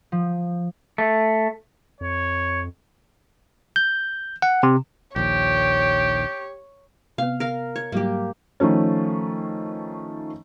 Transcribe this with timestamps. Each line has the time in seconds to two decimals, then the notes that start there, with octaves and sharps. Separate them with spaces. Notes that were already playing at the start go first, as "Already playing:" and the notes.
0.12 F3
0.98 A3
2.01 F2 C#5
3.76 G6
4.42 F#5
4.63 C3
5.16 A#1 D#2 G4 C#5
7.18 C3 B3 F5
7.40 A#4 F5
7.76 C#5
7.92 G#2 F#3 G3 A#3 G4
8.60 D#3 F3 A3 C#4